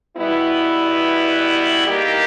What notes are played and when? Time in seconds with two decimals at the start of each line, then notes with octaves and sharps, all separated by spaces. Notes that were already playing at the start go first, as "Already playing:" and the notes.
0.16 B2 G3 B3 E4
1.85 D#3 A#3 D#4 G4